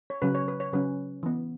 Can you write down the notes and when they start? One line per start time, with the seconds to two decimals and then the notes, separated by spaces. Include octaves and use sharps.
0.10 C#5
0.22 C#3 F#3 C#4 B4
0.35 C#5
0.48 B4
0.60 C#5
0.73 C#3 F#3 C#4 B4
1.23 E3 B3